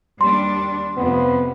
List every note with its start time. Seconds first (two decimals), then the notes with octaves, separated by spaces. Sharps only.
0.21 D#2 G3 D4 C6
0.97 F2 C3 B3